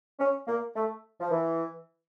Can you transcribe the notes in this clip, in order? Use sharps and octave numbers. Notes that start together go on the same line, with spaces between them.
C#4
A#3
A3
F3
E3